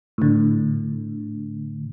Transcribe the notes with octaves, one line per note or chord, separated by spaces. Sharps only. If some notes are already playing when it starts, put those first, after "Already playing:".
A2 D3